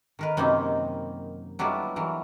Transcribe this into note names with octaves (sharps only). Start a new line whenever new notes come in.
D#3 A#4 B4
F#2 C3 A#3 C4 D#4
F#3 G3 B3 D4 E4 F4
E3 F#3 A#4